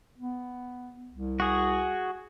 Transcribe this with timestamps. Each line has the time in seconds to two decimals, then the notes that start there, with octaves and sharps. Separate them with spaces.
0.18 B3
1.11 C2
1.40 F#4 G#4